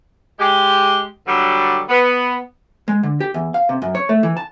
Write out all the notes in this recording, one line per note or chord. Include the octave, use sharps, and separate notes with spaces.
G#3 G4
D3 F#3 G3
B3
G#3
D3
G4
E2
F5
C3
F#2
C#5
A3
E3
A5